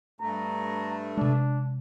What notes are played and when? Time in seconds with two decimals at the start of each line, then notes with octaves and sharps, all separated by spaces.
0.21 G2 A3 A#5
1.17 C3 G#3 D4